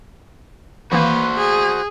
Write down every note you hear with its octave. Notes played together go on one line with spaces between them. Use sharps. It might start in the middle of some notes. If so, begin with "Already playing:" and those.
G#1 E3 A#3 F#4 B4 C5
G#4